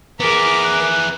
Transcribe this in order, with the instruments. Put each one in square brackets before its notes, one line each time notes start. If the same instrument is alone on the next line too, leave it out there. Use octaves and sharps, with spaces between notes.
[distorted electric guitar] B3 G#4 [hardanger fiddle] A#4 D6 [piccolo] B6
[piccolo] F#6